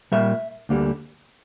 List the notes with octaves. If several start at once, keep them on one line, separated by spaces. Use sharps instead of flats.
A#2 G3 A#3 E5
D2 D3 G3 A#3